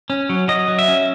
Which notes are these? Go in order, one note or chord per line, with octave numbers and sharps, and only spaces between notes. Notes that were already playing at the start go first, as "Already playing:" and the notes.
C#4
F#3
F#3 D#5
F#3
E5
C#4